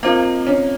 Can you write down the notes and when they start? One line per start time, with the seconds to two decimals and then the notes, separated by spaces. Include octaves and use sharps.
0.03 A#3 C4 F4 C5 D#5
0.47 C#4